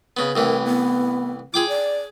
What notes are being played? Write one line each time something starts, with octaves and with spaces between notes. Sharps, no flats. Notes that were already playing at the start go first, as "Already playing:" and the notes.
C#3 B3
C2 A2 E3 A#4
B3
F4 G#4 G5 D6
D5